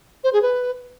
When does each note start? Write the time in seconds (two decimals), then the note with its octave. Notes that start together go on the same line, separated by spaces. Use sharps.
0.24 C5
0.33 G#4
0.42 B4